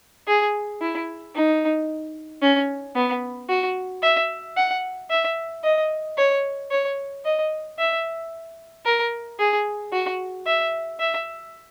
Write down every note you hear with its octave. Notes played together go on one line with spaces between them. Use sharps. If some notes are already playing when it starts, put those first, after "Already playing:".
G#4
E4
D#4
C#4
B3
F#4
E5
F#5
E5
D#5
C#5
C#5
D#5
E5
A#4
G#4
F#4
E5
E5